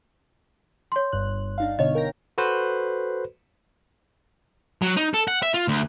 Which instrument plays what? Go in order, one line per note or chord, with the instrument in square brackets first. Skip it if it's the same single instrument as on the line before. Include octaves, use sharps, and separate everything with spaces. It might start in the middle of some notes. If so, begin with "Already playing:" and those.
[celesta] C#5 C6
[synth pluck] G1 G2 F#6
D4 D#4 F5
[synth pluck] B2 D3 C#5 [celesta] D#5
[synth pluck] A#4 G5 A#6
[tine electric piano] F#4 A4 B4 C5
[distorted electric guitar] F#3
D#4
A4
F#5
E5
F4
D2